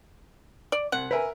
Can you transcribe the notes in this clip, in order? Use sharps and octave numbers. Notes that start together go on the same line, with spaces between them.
D5
C2 F#5
A#4 B4 E5 G#5